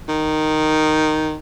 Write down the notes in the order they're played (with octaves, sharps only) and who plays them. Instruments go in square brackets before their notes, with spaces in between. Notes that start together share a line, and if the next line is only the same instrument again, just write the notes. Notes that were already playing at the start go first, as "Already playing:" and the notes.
[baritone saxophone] D#3